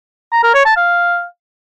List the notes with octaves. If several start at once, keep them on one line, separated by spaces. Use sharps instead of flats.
A#5
A#4
C#5
A5
F5